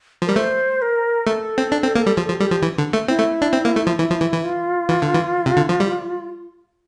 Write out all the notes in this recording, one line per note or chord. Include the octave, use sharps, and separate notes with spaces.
F3
G3 A#4
A3 C5
A#4
A3 A4
C4
D4
C4
A#3
G3
F3 G4
A4
F3
G4
G3 A4
F3 G4
E3
D3
A3
C4 E4
A3
D4
C4
A#3
A3
F3
E3 E4
F3
E3
E3
F4
E3
D3
E3
C3
D3
F3
G3